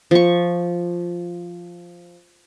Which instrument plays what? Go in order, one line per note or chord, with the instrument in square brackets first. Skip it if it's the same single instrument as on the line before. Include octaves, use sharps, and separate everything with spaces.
[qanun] F3 C#6